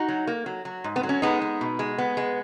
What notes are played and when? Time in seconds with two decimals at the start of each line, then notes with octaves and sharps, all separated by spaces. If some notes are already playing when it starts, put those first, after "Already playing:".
Already playing: D#4 F#4
0.09 F#3
0.27 A#3
0.46 F#3
0.65 F#3
0.84 G#2
0.96 B3
1.03 F#3
1.09 C#4
1.22 G#3 B3 D#4
1.42 B3
1.61 B2
1.79 G#3
1.98 B3
2.17 G#3